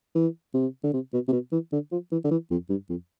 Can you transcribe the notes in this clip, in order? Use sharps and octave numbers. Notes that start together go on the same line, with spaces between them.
E3
C3
D3
C3
B2
C3
B2
E3
D3
F3
E3
D3
E3
F2
G2
F2